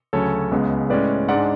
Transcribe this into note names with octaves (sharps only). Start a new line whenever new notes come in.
D2 C#3 F#3 C#4 A4 C#5
C#2 C#3 G#3 B3
A2 G#3 C#4 B4 D5
G#2 G#3 D4 D5 F#5